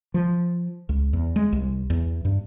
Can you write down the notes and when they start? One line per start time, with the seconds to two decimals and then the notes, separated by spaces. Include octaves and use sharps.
0.14 F3
0.89 C#2
1.13 E2
1.36 G#3
1.52 C2
1.90 E2
2.25 G2